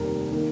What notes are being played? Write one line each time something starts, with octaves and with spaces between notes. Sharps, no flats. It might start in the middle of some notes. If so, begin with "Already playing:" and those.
Already playing: F1 D#2 D#3 G3 A#4
D#3 A#3